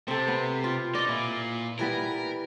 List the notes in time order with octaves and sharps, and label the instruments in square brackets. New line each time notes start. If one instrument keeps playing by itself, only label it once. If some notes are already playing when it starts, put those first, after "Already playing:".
[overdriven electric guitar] C3 [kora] C4 A4
[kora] B3
F4
[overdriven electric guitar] D#4 [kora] D5 D#5
[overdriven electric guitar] A#2 [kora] E4
[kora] E3 G3 B3 [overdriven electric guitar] A#4